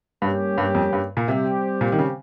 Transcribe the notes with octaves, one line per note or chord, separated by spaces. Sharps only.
G2 G3 A#3 C#4 G4
G2
F2
G2
A#2
C3 G3 C4 G4
A#2
D#3
C#3